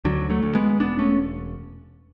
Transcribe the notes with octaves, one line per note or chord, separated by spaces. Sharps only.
D2 D3 F#3
F#3 A3
D2
G#3 B3
E1 B3 D4
A3 C#4